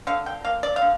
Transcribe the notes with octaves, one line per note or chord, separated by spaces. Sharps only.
D3 F5
G5
A#3 F5
D5
F5
D3